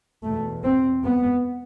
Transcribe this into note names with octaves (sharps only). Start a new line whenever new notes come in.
E2 B2 A3
C4
B3